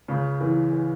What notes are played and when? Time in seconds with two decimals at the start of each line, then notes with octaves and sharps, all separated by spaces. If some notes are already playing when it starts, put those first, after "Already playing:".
0.08 C#2 C#3
0.40 E2 E3
0.72 E3